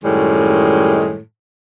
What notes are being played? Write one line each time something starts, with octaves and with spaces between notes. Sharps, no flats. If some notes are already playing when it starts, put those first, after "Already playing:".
F#2 A2 D#3 G3 G#3